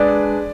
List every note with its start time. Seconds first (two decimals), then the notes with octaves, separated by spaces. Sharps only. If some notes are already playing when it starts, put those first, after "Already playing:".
Already playing: G#3 D4 G#4 B4 D5